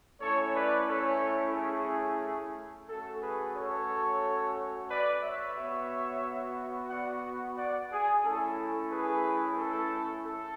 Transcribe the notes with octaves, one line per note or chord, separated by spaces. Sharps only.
A3 C#4 E4 A4 C#5
B4 D5
A4 C#5
G#4
A3 C#4 F#4 A4
G#4 B4
A4 C#5
B4 D5
C#5 E5
B3 F#4
D5 F#5
D5 F#5
G#4
A3 C#4 E4 A4
G#4 B4
A4
A4